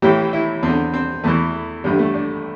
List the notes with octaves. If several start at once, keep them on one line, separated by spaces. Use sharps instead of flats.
A1 A2 E3 G4
E4
E2 C4
D3
C4
E2 E3 A3
A1 G2 D3 G3
A3
D4